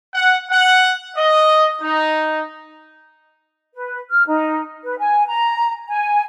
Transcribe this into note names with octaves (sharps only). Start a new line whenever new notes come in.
F#5
F#5
D#5
D#4
B4
F6
D#4
B4
G#5
A#5
G#5